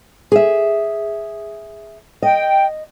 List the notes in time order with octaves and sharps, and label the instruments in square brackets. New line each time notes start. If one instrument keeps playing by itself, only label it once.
[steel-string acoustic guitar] G#4 E5
[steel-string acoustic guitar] D#5 [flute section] G5